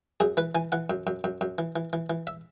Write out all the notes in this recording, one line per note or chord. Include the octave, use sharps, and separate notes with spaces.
F#2 G#4
E3 B4
E3 G#5
E3 F#5
F#2
F#2
F#2
F#2
E3
E3
E3
E3
E5